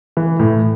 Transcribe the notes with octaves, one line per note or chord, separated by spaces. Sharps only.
E3
A2